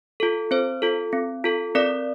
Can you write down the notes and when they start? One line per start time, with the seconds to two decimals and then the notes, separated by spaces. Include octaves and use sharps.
0.20 F4 A4
0.51 C4 C5
0.82 F4 A4
1.13 C4
1.44 F4 A4
1.75 C4 A#4 D5